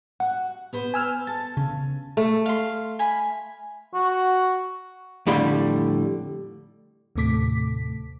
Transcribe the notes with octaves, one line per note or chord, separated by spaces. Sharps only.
F#4 F#5
B3 B4 C5
G#5 E6 F6
A4 A6
C#3 C#4
A3
F5 C6
G#5 B5
F#4
F2 A2 D3 G3
D#2 A2 C3 A3 D6 B6